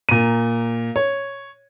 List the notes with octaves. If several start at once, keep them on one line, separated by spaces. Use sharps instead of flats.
A#2 D#7
C#5